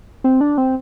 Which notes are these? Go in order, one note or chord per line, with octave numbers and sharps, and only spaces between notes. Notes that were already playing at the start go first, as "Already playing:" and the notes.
C4
D4
C4